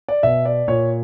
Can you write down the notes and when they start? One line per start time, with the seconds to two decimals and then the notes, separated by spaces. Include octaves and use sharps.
0.09 D5
0.23 B2 E5
0.45 D5
0.68 A#2 C#5